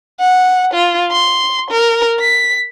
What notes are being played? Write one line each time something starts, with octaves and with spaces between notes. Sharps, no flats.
F#5
F4
C6
A#4
B6